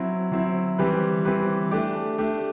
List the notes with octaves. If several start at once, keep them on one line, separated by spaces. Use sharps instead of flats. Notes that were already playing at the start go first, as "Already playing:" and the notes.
Already playing: F#3 C4 E4
F#3 C4 E4
E3 G3 C4 G4 B4
E3 G3 C4 G4 B4
A3 D4 G4
A3 D4 G4